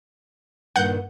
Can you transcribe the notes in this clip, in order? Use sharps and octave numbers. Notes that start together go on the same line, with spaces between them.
G2 A#2 D#3 F#5 G6